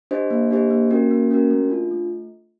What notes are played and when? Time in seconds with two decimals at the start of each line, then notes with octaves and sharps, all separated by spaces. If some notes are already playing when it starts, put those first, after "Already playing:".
0.11 D4 G4 C5 D#5
0.31 A#3
0.51 D4 G4 C5 D#5
0.70 A#3
0.91 C#4 F#4 A#4
1.11 A#3
1.31 C#4 F#4 A#4
1.51 A3
1.70 D4 F4
1.91 A3